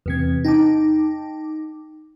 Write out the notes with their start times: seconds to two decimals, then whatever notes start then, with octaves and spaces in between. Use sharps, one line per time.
0.06 E2 C3 G#6
0.45 D#4 G5 A5 D6